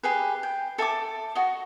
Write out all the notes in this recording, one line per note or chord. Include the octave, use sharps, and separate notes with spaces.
G4 G#4 B4
G5
A4 E5 A5 D6
F#4 D#5